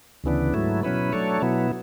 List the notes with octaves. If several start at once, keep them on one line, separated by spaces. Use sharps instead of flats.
D2 C#3 E3 B3 D4
G#2 F#3 A3 E4
B2 F#3 C#4 E4 B4
F#3 A3 D4 A4 C#5
B2 F#3 B3 E4